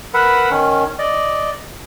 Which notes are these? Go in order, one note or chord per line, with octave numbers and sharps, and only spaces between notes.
A#4 B4 F#5 B5 E6
D#3 C#4
D5 D#5